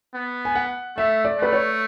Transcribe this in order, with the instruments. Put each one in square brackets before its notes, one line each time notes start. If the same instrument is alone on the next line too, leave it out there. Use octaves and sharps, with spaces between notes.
[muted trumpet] B3
[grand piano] G#5
F#5
[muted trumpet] A3 [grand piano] E5
[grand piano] D5
[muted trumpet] A3 [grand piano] B4
[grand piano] C#5